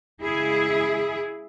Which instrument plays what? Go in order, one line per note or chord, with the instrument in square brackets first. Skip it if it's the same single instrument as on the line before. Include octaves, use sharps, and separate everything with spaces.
[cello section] C#3 G#3 E4 G#4